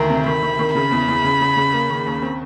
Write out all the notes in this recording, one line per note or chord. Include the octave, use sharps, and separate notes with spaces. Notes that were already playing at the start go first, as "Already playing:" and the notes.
Already playing: D2 D#3 A#5
C3
D#3 B5
D#3
D#3
C#3 B5
E2
E2
C#3
C#3
C#3
A#3
D#3
D#2
C4